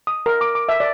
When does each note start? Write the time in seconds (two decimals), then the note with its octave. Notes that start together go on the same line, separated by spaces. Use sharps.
0.07 D#6
0.26 A#4
0.41 D6
0.55 D6
0.69 E5
0.80 D5